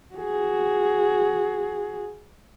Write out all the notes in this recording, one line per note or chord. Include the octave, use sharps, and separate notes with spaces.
F#4 G#4